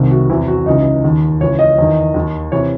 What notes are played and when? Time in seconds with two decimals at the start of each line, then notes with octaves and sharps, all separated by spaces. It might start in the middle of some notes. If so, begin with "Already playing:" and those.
Already playing: C2 C3 D#3
0.11 F#4
0.29 E2 C3 E3 E4
0.48 F#4
0.66 C#2 C#3 E3 D#4
1.04 D#2 D#3
1.40 C#2 C#3 E3 C#5
1.59 D#5
1.78 E2 D#3
2.14 D#2 D#3
2.52 C3 E3 C#5